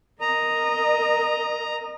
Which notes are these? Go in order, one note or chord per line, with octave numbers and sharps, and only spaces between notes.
A#4 D#5 A#5